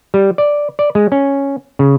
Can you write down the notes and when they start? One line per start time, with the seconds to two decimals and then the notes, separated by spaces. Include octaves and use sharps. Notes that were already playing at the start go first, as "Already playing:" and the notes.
0.14 G3
0.38 D5
0.79 D5
0.95 G#3
1.12 C#4
1.79 C#3